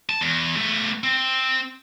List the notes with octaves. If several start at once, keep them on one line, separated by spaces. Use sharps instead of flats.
A5
E2
A3 B3
C4